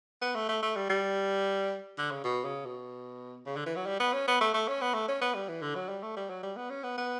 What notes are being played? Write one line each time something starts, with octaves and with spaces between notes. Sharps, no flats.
B3
A3
A3
A3
G3
G3
D3
C#3
B2
C#3
B2
C#3
D3
E3
F#3
G3
B3
C#4
B3
A3
A3
C#4
B3
A3
C#4
B3
G3
E3
D3
F#3
G3
A3
G3
F#3
G3
B3
C#4
B3
B3